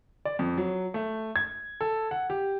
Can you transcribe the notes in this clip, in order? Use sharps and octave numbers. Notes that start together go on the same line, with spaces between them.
D5
F2
F#3
A3
G#6
A4
F#5
G4